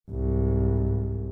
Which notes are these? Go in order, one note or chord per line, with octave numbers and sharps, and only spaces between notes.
C2 G#2